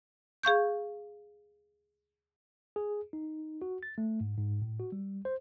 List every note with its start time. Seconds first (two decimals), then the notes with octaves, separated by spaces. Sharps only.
0.43 G#4 F5 C#6 G6
2.76 G#4
3.13 D#4
3.62 F#4
3.83 A6
3.98 A3
4.21 G#2
4.38 G#2
4.62 A2
4.80 F#4
4.92 G3
5.25 C5